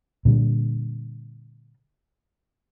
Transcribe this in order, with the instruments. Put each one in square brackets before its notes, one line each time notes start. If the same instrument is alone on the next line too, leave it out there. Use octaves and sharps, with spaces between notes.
[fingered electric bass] A#2 D3 G3